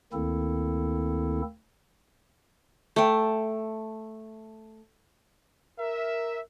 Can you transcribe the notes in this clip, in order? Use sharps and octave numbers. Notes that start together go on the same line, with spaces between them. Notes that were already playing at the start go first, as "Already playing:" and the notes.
D2 D#3 A#3 C4 E4 A4
A3 G5
A#4 E5